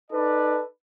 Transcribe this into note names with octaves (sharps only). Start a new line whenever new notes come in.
D#4 A4 B4 D5